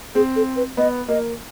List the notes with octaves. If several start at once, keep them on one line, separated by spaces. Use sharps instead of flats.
C4 G#4
A4
B4
B3 D#5
A#3 D#5